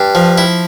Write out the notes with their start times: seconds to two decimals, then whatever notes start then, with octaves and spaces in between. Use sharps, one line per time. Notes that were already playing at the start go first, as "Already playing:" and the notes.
Already playing: G2
0.15 F3
0.38 E4